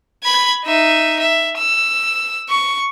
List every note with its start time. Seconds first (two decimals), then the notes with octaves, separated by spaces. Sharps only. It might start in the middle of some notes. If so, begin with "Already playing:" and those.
0.23 B5 G#6
0.64 D#4 E5
1.20 E5
1.57 E6
2.49 C#6